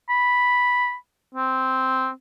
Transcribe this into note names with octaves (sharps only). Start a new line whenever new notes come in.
B5
C4